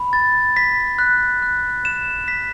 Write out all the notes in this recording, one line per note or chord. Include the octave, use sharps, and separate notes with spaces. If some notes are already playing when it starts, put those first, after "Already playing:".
Already playing: B5
A6
B6
F#6
F#6
E7
B6